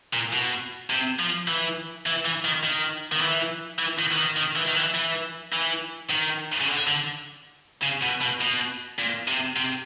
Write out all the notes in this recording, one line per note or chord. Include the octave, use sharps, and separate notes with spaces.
A#2
B2
C3
F3
E3
E3
E3
D#3
D#3
D#3
E3
E3
D#3
E3
D#3
D#3
E3
D#3
E3
E3
E3
D#3
C#3
D3
D3
C#3
B2
B2
B2
A#2
C3
C3